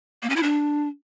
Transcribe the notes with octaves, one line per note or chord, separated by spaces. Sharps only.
A#3
C#4
E4
D4